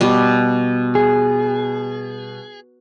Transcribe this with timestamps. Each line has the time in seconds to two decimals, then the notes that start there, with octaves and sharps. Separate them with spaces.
0.01 B2 G3
0.95 G#4